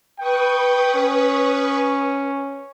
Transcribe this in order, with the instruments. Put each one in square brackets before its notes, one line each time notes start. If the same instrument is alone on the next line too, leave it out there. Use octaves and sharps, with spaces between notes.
[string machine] B4 C#6 D#6 [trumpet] G5
[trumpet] C#4